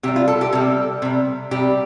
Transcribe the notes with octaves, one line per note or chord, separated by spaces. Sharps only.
C3 G3 G4
F4
A4
G4
C3 G3 A4
C3 G3
C3 G3 G4